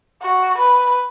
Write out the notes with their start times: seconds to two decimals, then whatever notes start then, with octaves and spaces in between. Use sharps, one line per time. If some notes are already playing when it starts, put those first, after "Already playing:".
0.21 F#4
0.58 B4